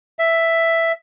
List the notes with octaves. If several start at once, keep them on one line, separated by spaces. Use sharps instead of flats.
E5